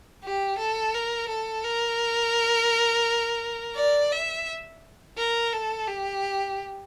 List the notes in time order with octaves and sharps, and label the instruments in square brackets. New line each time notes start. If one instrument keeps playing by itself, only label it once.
[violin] G4
A4
A#4
A4
A#4
D5
E5
A#4
A4
G4